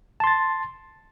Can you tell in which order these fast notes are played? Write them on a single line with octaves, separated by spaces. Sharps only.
A5 C6 A6